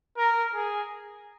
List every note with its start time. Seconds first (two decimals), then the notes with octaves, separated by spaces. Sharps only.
0.17 A#4
0.55 G#4